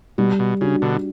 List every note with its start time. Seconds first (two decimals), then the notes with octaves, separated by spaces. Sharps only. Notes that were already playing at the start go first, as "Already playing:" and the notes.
0.18 B2 G3
0.39 B2
0.61 C#3 D4 F#4
0.82 B2 D3